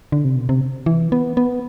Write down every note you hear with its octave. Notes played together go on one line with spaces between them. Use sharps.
D3
C3
B2
C3
E3
B3
B3